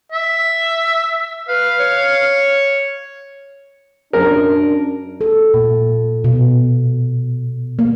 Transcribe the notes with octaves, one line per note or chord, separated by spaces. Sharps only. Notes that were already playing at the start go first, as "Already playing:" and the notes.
E5
B4 F5
C#5
F#2 C#4 D4 A#4
A4
A#2
B2
A#3